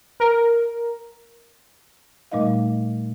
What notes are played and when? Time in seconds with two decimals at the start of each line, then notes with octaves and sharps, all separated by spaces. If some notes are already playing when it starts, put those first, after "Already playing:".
0.20 A#4
2.32 A#2 G3 A3 D#4 D#5 F5